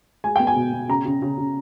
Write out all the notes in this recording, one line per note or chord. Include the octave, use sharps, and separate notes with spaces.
G#3 G#5
B3 G5
G#5
B2
B2
C#3 A#5
C#3
C#3
C#3